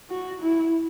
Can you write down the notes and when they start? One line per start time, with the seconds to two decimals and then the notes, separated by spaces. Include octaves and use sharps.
0.10 F#4
0.41 E4